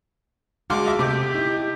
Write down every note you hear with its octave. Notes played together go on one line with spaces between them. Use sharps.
D2 G#3 F#4 F5 C6 D6
F4 D#5 E5
C3 A3 G4 D6
D#4 E4